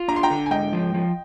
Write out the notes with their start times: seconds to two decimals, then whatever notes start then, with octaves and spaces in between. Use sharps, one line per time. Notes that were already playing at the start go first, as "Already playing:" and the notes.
Already playing: F4
0.08 D4 A#5
0.16 C6
0.23 G5 A#5
0.30 D3
0.46 G#5
0.51 G#2 D#5 G5
0.73 F3
0.94 F3